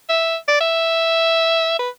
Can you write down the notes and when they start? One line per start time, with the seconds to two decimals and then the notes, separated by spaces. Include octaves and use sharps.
0.09 E5
0.48 D5
0.61 E5
1.79 B4